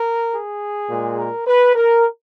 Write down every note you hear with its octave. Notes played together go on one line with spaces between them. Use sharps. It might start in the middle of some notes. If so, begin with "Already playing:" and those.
Already playing: A#4
G#4
A#2 G#3
A#4
B4
A#4